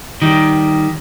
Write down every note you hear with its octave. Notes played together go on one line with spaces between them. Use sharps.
D#3 G3